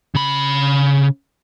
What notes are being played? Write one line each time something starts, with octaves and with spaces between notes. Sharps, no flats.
C#3 B5